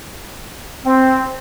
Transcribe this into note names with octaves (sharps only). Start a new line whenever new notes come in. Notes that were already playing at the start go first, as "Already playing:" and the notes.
C4